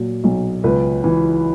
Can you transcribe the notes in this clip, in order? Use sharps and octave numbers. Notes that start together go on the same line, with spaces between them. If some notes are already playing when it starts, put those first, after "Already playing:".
Already playing: A#2 F#3
B1
C#2 B4
E3